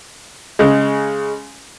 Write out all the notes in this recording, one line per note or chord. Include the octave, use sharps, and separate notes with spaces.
C#3 G#3